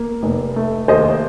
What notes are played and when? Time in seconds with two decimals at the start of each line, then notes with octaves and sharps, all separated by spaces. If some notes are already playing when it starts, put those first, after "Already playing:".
Already playing: A#3
0.22 F1
0.56 A3
0.88 D#2 C5 D#5